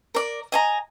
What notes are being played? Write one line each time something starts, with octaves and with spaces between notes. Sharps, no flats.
A#4 D5
D#5 G#5 A#5